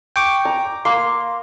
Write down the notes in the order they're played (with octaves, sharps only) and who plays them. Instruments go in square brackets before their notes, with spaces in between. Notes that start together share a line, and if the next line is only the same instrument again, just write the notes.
[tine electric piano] G5 C#6 D6
[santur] A#5
[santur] A#3 [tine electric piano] C6